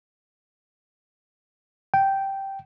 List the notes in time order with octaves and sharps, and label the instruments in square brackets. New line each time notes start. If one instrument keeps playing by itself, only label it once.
[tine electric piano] G5